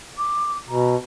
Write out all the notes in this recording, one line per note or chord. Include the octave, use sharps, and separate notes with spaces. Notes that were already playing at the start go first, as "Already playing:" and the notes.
D6
B2 A#5